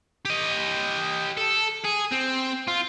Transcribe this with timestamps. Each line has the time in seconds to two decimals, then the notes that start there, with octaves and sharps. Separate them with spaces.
0.25 G4 D#5
1.37 A4
1.85 G#4
2.12 C4
2.68 F4